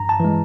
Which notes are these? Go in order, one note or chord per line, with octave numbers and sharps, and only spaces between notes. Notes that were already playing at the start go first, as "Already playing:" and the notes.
Already playing: G2 A#5
A5
E3 G#3